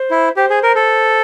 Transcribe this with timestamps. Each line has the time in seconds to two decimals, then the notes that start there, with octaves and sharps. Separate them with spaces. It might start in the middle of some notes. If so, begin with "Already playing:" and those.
Already playing: C5
0.11 E4
0.36 G4 C5
0.50 G#4
0.63 A#4
0.76 A4